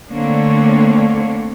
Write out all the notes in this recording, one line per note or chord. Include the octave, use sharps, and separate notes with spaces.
D3 A3 A#3 C4 D4 C#5